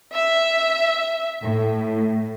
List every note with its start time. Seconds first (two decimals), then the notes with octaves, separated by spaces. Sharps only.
0.14 E5
1.43 A2